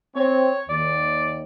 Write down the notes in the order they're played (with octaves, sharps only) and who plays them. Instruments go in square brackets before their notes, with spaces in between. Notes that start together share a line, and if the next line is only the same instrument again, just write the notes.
[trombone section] C4 [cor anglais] C#5
[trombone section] D#2 [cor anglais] D5